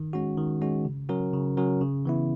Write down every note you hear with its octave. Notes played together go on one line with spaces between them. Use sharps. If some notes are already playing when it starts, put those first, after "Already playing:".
Already playing: D#3
G#3 C#4 F#4
D#3
G#3 C#4 F#4
C#3
F#3 C#4 F#4 A#4
C#3
F#3 C#4 F#4 A#4
C#3
E3 B3 E4